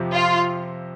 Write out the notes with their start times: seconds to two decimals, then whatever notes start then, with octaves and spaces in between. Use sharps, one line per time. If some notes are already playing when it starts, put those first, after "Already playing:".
Already playing: F2 C3 F3 C4 G4
0.13 F4